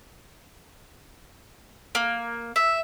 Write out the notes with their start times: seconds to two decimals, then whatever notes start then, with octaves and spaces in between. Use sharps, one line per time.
1.95 A#3
2.56 E5